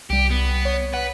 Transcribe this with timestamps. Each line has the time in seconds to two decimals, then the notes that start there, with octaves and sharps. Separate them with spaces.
0.10 C2 G3 G4
0.30 B3
0.65 C#5
0.94 B4 F#5